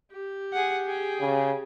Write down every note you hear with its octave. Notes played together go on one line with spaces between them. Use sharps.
G4
G#4 F#5
G#4 G5
C#3